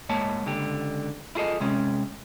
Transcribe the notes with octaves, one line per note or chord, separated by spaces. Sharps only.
G#2 G#3 A#3 C#5 A5
C#2 D3 G4
E4 F4 G#4 A4 D#5
C3 G#3 C#4